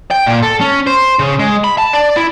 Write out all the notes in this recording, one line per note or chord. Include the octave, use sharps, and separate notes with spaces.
G5
A#2
A4
C#4
C5
C#3
G#3
B5
A5
D5
E4